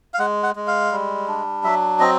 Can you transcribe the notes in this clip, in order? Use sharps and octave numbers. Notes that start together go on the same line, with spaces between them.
F5
G#3 F#5
F#5
G#3
F5
G3
D4
F#3 E5
C4 D#5